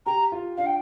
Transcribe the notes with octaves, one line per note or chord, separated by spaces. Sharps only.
G4 A#5
F4
D4 F5
G5